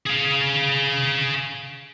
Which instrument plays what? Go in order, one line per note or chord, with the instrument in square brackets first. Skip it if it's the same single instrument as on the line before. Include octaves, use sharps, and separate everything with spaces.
[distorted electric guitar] G#4 F5